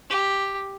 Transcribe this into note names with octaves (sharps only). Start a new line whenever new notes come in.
G4